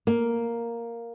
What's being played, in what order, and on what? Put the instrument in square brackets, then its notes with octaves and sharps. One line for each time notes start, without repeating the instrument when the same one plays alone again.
[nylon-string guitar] A#3